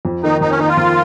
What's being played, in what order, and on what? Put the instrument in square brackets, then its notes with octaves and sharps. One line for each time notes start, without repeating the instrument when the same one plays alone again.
[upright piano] F2
[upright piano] D#3 A#3 [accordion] D#4
[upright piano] F2 [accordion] D#4
[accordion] C#4
[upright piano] D#3 A#3 [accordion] D#4
[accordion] F4
[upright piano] F2